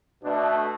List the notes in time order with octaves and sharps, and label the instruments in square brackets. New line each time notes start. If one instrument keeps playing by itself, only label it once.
[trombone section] B2 A3 D4